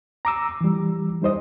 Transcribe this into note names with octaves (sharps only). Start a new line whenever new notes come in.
A#5 D6 E6
E3 G3
G3 D#4 C5 D#5